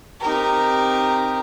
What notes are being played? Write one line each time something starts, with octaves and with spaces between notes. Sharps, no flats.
C4 D#4 G4 A#4